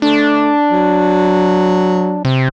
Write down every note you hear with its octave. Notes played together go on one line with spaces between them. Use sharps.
A3 D4
F#3
C3